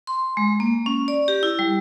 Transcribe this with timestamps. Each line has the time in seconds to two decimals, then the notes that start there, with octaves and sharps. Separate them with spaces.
0.07 C6
0.37 G#3
0.60 A#3
0.86 C#4
1.08 D5
1.28 G4
1.43 E4
1.59 G3